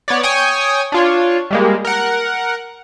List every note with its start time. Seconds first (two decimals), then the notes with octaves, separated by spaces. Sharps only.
0.08 B3 C#5 D5
0.23 C#5 G5 G#5 C#6 D#6
0.92 D4 F4 C#5
1.51 G3 G#3 A#3
1.85 A#4 F#5